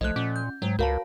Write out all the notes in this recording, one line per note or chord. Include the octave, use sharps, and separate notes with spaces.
B1 F3 A3 D#5 F#6
A#2 C#4
G6
G#2 F#3 G5
C#2 F#4 A#4 B4 C#5 F5 A5